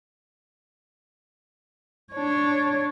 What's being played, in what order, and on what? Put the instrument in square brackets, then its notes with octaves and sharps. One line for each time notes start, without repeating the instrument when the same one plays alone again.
[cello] D4 C#5